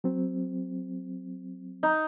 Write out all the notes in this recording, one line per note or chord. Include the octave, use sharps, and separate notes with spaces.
F#3 C4
D#4